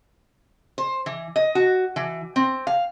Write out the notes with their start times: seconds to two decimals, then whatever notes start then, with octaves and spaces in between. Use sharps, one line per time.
0.78 C5
1.06 E3
1.36 D#5
1.55 F#4
1.96 E3
2.36 C4
2.67 F5